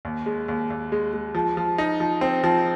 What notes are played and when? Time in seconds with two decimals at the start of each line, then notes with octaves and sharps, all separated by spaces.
0.05 D#2
0.26 G#3
0.48 D#2
0.70 D#2
0.92 G#3
1.13 G#3
1.35 F3
1.57 F3
1.78 D#4
2.00 F3
2.21 C4
2.44 F3